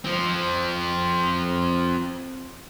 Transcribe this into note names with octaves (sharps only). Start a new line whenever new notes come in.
F3 C4